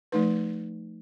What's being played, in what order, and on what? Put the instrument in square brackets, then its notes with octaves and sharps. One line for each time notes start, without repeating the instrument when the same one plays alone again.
[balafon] F3 A3 D#4 B4